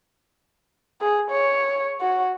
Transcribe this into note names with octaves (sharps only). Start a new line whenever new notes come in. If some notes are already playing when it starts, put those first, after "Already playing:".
G#4
C#5
F#4